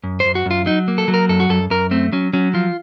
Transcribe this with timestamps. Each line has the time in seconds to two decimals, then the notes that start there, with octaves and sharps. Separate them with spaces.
0.04 F#2
0.20 F#2 C5
0.35 F#4
0.46 F#2 F4
0.66 F#3 D#4
0.88 A#3
0.98 A4
1.08 F#3
1.14 A#4
1.29 F#2 A4
1.40 F#4
1.49 F#2 A4
1.70 F#2 A#4
1.91 A3 C4
2.12 F#3 C#4
2.33 F#3 C#4
2.54 F3 F4